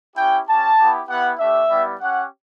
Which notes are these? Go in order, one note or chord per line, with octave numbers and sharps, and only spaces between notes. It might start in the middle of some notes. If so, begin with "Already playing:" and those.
C#4 E4 G4 G5
C#4 G4 A5
B3 E4 G4
B3 E4 G4 F#5
A3 D4 G4 E5
G3 B3 E4 G4
C#4 G4 F#5